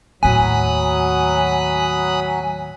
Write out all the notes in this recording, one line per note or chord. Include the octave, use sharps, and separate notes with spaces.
D#2 A2 F#3 G#5 B5 D#6 F#6